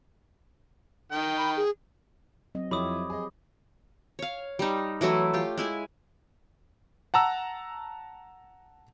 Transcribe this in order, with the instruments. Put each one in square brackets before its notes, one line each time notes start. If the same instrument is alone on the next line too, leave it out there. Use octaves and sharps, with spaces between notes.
[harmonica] D#3 G5
[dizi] B5
G#4
[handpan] F#3 C4 D#5
[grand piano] F2 E4 [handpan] F3 G4 C#5 [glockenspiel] B5 D6 D#6
[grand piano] G#4 D#5
[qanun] C#5 F5
G3 D#4
E3 F#3 A3 E4
F4 G4
G#3 E4 G#5
[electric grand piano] F#5 A5 A#5 E6